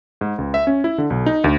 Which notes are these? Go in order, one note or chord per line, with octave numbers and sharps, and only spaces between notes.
G#2
C#2
E5
C#4
E4
D3
B1
D#4
D2